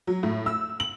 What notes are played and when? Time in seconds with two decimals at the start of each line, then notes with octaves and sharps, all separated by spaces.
0.07 F#3
0.23 A2
0.46 E6
0.80 F#7